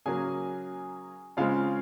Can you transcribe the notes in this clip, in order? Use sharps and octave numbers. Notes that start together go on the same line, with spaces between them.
C#3 F#3 A#3 G#4 G#5
C#3 G#3 C4 F4 F5